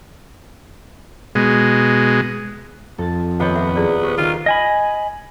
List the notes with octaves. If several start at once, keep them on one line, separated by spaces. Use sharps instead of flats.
B2 G#3
F2 A4 A6
D#1 B3 C#5 D#5 F#5 B5 C#7
E5 F#5
E4 G#4 D5
G4 C5
D#2 D#3 F4
D#5 G#5 B5